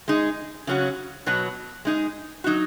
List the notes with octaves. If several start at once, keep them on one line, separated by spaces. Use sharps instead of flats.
G#3 D#4 G#4
C#3 F#3 C#4 F#4
B2 F#3 B3 F#4
G#3 D#4 G#4
F#3 D#4 F#4